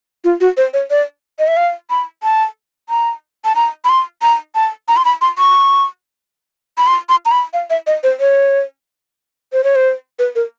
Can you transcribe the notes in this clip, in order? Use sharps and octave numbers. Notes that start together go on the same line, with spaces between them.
F4
F#4
C5
C#5
D5
D#5
E5
F5
B5
A5
A#5
A5
A#5
B5
C6
A#5
A5
A#5
C6
B5
C6
C#6
B5
C6
C6
A#5
B5
F5
E5
D#5
C5
C#5
C5
C#5
C5
B4
A#4